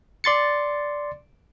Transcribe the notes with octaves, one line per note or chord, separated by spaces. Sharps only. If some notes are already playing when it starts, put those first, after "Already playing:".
D5 C6 A6 C#7